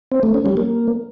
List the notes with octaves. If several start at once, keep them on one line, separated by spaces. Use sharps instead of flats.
C4
A3
C#4
G3
A#3